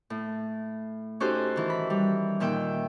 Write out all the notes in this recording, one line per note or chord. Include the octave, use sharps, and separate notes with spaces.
A2
C#4 D#4 F#4 G4 A4 C5
D#3 E3
B5
G3
A#2 D#3 E5 G5